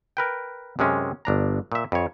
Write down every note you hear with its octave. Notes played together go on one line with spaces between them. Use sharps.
A#4 B4 G5
F#2 C3 G#3 C#4
G1 D4 A#5
A#2 E5
F2 C#5